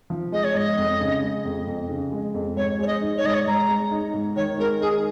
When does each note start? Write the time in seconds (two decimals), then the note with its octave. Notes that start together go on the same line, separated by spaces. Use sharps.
0.10 F3
0.32 G#3 D#5
0.43 C#5
0.55 G#2 D#5
0.77 F2
1.00 C#3
1.23 G#3
1.45 F2
1.67 F2
1.89 C#3
2.12 G#3
2.34 F2
2.56 G#2 C#5
2.79 G#3 C#5
2.86 D#5
3.01 D#4
3.17 C#5
3.24 G#2 D#5
3.33 C#5
3.47 G#2 A#5
3.69 G#3
3.91 D#4
4.14 G#2
4.36 D#3 C#5
4.58 G#3 A#4
4.81 D#4 G#4